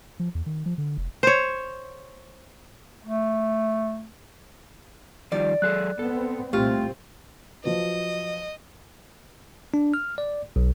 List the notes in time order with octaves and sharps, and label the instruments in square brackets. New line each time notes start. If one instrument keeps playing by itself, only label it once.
[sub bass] F3
E2
D#3
F3
D3
F1
[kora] C5 C#5
[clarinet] A3
[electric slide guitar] D#3 F3 G3 [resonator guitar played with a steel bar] D5
[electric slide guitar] F#3 G#4 A4 [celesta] F#6
[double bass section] B3 C4 [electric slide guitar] A4
[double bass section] C2 A#2 C4 [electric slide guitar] A3 [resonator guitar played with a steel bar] F4 [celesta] G4
[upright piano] F3 F#3 B4 [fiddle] D#5
[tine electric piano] D4
F6
D5
B1